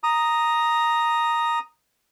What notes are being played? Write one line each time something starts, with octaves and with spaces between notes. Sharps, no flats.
A#5 D#6